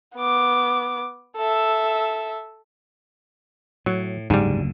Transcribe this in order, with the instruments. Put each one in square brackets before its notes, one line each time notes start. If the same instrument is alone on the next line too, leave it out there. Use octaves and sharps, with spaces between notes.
[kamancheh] B3 D6
A4 E5
[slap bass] A2 [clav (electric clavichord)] F#3
[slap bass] F#1 D2 D3 [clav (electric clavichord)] G#2 G3